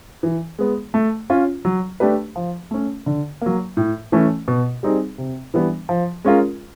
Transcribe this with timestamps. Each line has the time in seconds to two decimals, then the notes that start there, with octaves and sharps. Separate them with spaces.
0.23 E3
0.59 G#3 B3
0.94 A3
1.30 C#4 F4
1.65 F#3
2.00 A3 D4 G4 B4
2.36 F3
2.71 A3 C#4
3.06 D3
3.42 F#3 A#3
3.77 A2
4.12 E3 A3 C#4
4.48 B2
4.83 G3 C4 D#4 G#4
5.18 C3
5.54 E3 G3 B3 D4
5.89 F3
6.24 G#3 C#4 F4 A#4